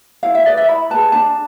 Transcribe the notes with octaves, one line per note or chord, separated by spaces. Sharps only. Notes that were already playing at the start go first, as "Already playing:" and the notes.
E4 F5
E5
G#4 B4 D5
E5
E4 B5
G#4 B4 A5
D4 A5